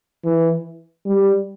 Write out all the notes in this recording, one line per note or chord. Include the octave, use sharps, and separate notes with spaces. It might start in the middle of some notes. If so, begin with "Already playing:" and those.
E3
G3